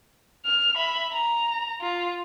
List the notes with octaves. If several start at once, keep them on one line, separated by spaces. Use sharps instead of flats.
F6
E5 B5
A#5
F4